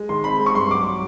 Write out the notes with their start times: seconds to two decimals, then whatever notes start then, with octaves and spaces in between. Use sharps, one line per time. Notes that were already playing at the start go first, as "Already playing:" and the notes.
Already playing: G#3
0.09 D#3 C6
0.24 C4 B5
0.39 G#3
0.46 C#6
0.55 G2 C6
0.71 F#3 D6
0.86 F#3